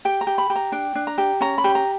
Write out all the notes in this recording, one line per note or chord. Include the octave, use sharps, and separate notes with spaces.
G4 G5
A#5
G4
B5
G4
A#5
D4 G5
D4
A#5
G4
C#4 A#5
B5
G4
A#5